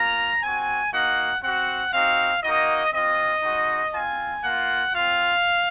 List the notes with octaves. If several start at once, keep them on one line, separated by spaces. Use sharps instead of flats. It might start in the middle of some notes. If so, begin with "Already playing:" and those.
Already playing: A#3 F4 A#5
C4 F#4 G#5
A#3 D#4 F#4 F#5
C4 F#4 F#5
C4 D#4 F#4 F5
A#3 D#4 F#4 D#5
C4 F4 D#5
G#3 D#4 F#4
C4 F4 G#5
A#3 F4 F#5
C4 F4 F5